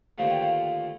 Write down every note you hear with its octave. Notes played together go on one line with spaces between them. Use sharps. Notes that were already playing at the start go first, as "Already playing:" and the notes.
D#2 D3 F3 A3 F5
G5
F5